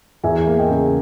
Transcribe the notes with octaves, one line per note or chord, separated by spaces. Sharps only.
E2 E5 G#5
A#3
D#5 G5
C#3